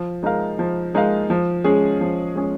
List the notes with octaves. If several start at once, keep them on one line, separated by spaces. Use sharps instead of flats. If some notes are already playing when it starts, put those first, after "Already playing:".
Already playing: F3
G#3 D#4 A#4 F5
F3
G#3 D#4 A#4 F5
F3
G#3 C#4 G#4
F3
G#3 C#4 G#4